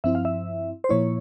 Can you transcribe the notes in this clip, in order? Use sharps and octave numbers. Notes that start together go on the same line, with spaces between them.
G2 F3 C4 E4 E5
F5
E5
C5
A#2 F3 A#3 E4 C#5